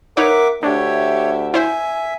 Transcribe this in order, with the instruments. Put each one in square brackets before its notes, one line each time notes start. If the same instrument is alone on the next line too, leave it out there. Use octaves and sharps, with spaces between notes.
[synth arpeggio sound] D#4 B4 C#5 [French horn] A#4 [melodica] E5 F#5 D6
[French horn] D2 [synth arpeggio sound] D4 [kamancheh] G4 E5 [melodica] C#5
[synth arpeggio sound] E4 C5 [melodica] E5 [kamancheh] G#5